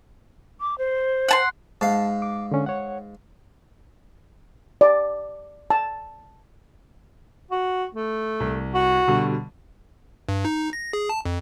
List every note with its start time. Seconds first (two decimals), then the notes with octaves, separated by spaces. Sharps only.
0.61 D6
0.78 C5
1.29 F#5 A5 C6
1.81 G#2 F5 A5
2.22 D6
2.51 D3 C#4
2.66 C#5 F#5
4.81 D5
5.70 A5
7.51 F#4
7.95 A3
8.40 C2
8.74 F#4
9.07 B2 D3 G3
10.29 G2
10.45 D#4
10.73 A#6
10.93 G#4
11.09 A5
11.25 F2